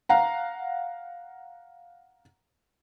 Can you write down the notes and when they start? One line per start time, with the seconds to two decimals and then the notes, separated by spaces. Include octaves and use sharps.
0.09 F5 F#5 A#5